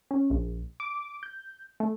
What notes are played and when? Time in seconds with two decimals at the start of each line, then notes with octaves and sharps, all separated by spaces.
0.11 C#4
0.30 A#1
0.80 D6
1.23 G6
1.80 A3